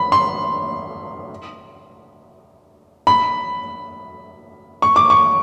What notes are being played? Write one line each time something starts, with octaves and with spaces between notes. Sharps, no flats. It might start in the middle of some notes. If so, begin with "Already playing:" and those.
Already playing: B5
C6
B5
C#6
D6
C#6